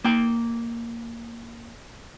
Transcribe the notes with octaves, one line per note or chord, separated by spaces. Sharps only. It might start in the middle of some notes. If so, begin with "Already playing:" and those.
A#3 G5